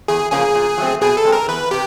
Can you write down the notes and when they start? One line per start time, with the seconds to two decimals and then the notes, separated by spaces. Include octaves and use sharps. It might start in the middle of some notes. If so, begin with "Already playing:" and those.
0.08 E2 G#4
0.32 C#3 F3 A#3 C#4 G#4
0.55 A#2
0.78 F#3 A3 C4
1.01 B2 G#4
1.17 A4
1.24 G#3 C4
1.32 A#4
1.48 E2 B4
1.71 C3 G4